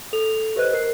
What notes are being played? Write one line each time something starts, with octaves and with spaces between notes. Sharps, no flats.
A4 F7
G4 B4 C5 D#5 F#6
A#4 C7